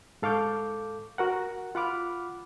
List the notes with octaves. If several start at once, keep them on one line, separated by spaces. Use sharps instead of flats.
G#2 A4 F5 C#6 D6 G6
F#4 A#4 F#5
F4 F#5 B5 D6 F6